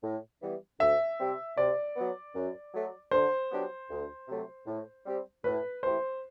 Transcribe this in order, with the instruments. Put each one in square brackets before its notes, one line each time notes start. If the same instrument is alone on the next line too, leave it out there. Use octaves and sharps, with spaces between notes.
[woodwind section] A2
E3 G3 B3
[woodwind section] D2 [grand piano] E5
[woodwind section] C3 G3 C4 G4
[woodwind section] C3 [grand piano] D5
[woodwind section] F#3 B3
F#2
F#3 A3
[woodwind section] D3 [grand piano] C5
[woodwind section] F#3 B3 D4 G4
D2
C3 F#3 A3
A2
G3 C4 G4
[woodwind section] A2 [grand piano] B4
[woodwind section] E3 A3 E4 G4 [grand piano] C5